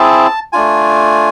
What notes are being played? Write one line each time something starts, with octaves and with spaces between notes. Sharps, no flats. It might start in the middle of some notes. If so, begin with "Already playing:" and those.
Already playing: C4 E4 G#4 A5
A3 D4 F4 G#5